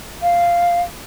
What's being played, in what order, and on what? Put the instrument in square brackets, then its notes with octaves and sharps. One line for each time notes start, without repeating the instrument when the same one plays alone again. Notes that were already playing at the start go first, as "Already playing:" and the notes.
[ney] F5